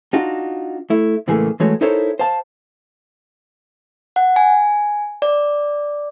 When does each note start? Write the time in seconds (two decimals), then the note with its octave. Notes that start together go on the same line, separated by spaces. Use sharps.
0.13 D4 D#4 F4 F#4
0.90 A3 E4
1.28 C#2 A2 E3 A3 A#3 G#4
1.60 E3 G#3 A3 F#4 C#5
1.81 D#4 E4 A4 A#4 C5 C#5
2.19 C5 F5 A5
4.16 F#5
4.36 G#5
5.22 D5